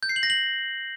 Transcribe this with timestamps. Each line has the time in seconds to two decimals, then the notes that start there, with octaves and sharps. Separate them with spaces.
0.03 G6
0.09 C7
0.16 F#7
0.23 A#6
0.30 F#7